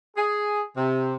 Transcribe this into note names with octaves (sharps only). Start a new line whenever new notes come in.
G#4
C3